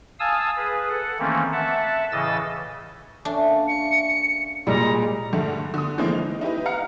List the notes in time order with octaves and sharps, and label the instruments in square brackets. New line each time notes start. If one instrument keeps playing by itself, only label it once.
[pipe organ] F5 G#5 A5 D#6 E6
G#4 B4
A4 F#5
D#3 E3 A3 A#3 C4 C#4
E5 F#5 A5
A2 C#3 E3 D#5 E6 A6
[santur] A3 C#4 [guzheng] D4
[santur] A#3
[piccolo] C#7
[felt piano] A#2 G3 G#3 [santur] D#5 [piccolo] A#5
[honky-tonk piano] D2 G2 D3 A3 F#5
D3 D#6
D3 E3 F3 G#3 A#3 C4
D#4 F7
D#4 E4 G4 B4
F5 F#5 A#5 F6 C#7